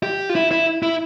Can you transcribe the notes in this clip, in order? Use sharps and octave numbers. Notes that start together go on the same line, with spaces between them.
G4
F4
E4
E4
E4